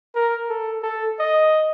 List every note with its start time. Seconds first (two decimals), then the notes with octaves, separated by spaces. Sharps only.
0.15 A#4
0.49 A4
0.83 A4
1.19 D#5